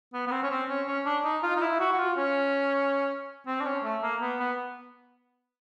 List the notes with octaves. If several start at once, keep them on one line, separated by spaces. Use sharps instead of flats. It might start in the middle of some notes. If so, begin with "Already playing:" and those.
B3
B3
C4
C#4
C4
C#4
C#4
D4
D#4
F4
D#4
E4
F#4
F#4
F4
C#4
C4
D4
C#4
A3
A#3
B3
B3